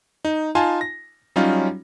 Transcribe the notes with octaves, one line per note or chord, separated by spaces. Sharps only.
D#4
D#4 F4 G#5 A5 C6
A#6
F#3 G3 C#4 D#4 F4